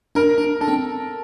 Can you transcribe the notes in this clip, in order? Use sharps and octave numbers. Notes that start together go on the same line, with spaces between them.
D4 A#4
D4
D4 A4
C4